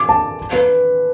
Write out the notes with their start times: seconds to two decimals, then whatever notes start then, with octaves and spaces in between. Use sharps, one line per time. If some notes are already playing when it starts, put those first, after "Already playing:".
Already playing: D6
0.09 A5
0.53 B4